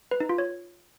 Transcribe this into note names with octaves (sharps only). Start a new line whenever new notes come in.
B4
D#4
F4
C#5